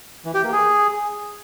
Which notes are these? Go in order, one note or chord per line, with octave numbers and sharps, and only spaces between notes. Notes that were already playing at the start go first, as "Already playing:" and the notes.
E3
G4
A#3
G#4